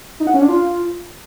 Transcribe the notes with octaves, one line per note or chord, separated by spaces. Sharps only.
D#4
F#5
C#4
D4
F4